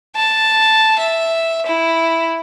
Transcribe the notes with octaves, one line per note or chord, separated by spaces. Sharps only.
A5
E5
E4